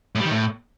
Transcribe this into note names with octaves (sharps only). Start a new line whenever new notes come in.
A2
G3
D#3
A2